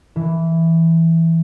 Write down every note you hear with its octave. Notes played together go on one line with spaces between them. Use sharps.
E3